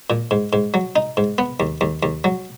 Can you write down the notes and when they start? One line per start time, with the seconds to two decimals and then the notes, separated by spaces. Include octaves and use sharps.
0.10 A#2
0.31 G#2
0.53 G#2
0.74 F#3
0.96 D#4
1.17 G#2
1.38 B3
1.60 D#2
1.81 D#2
2.03 D#2
2.24 F#3